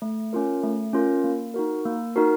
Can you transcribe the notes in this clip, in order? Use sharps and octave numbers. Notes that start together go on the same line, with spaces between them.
A3
C#4 F4 A#4
A3
C#4 F4 A#4
A#3
D#4 F#4 A#4
A#3
D#4 F#4 A#4